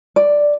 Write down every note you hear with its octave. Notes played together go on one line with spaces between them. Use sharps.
D5